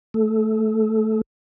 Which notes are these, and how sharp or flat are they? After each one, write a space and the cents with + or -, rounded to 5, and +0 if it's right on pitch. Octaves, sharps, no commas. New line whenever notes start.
A3 +0 A4 -20